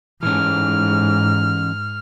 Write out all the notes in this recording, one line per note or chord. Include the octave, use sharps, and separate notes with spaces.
G#2 E3 C#4 F6